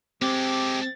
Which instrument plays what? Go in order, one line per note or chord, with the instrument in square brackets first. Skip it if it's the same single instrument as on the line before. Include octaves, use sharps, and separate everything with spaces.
[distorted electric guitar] G#3 A4 [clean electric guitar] C4 [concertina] G4 D6